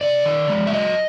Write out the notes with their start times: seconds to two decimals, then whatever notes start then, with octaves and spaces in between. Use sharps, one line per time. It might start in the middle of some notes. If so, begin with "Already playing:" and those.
0.01 C3 D5
0.26 D#3
0.49 G#3
0.67 E5
0.73 F#3 D#5